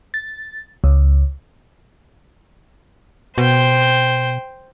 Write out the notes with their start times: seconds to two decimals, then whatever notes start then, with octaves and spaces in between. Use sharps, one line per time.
0.14 A6
0.84 C#2
3.38 B2 C5 G5